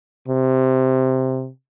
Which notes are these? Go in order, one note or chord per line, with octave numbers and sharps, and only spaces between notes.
C3